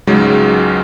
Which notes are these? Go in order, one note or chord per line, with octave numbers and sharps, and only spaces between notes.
C#2 G#2 C#3 F#3 G#3